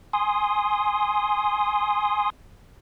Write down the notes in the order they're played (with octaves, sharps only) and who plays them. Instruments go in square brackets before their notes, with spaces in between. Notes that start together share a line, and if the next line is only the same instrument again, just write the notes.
[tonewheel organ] G#5 C6 D#6